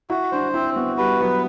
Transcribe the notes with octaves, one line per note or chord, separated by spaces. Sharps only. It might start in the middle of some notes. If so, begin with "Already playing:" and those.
E4 F#4
D4 C5
C4 E4
B3 F#4
G3 B4
F#3 B3